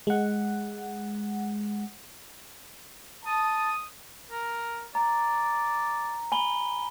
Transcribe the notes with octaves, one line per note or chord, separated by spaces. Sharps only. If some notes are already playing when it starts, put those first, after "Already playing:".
G#3 F#5
A5 D#6
A#4
D5 A#5
G#5 B5 G7